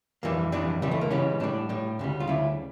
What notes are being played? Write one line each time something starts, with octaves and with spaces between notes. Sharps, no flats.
F2 E3 G3 A#3
F2 E3 G3 D4
C#2 C#3 E3 G3
A3
A#3
C#2 C#3 E3 G3 C#4
A2 G3 D4
A2 G3
D2 C#3 G3
F4
D2 C#3 G3 E4